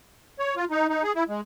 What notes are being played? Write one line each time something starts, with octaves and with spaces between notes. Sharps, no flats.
C#5
F4
D#4
D#4
G#4
E4
G#3